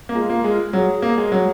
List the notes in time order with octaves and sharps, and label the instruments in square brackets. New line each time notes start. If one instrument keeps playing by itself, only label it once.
[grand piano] A#3
[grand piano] G#3 [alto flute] F4
[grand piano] A#3
G#3
[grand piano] F#3 [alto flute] G#4
[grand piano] A#3
G#3
[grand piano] F#3 [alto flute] G#4